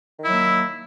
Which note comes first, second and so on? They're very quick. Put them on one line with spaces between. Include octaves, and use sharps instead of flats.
D#3 E4 F#3 A#3